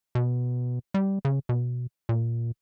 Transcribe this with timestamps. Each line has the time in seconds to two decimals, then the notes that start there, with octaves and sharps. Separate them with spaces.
0.15 B2
0.94 G3
1.25 C#3
1.49 B2
2.09 A#2